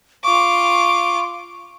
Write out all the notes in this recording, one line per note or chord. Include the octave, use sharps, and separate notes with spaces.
F4 C#6 D6